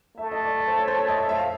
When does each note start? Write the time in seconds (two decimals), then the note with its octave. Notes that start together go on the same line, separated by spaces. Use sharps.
0.17 A3 E5
0.32 D#5
0.45 D5
0.58 D5
0.68 C5
0.79 C#5
0.88 C5
0.98 C#5
1.08 D#5
1.19 E5
1.29 E5
1.38 F5